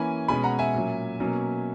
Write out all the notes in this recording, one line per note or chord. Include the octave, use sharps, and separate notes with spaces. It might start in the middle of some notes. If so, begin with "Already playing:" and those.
Already playing: E3 A#3 C#4 G#5 B5
B2 G#3 C#4 G#5 B5
F#5 A#5
E5 G#5
A#2 F#3 C#4
B2 F#3 A#3 C#4